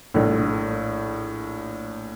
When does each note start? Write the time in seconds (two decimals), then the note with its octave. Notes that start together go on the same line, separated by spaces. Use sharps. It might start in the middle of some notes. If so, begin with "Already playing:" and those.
0.14 A#1 A2